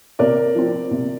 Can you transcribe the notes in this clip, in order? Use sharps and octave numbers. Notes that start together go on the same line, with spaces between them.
C3 A#4 D5
F3 C4
C3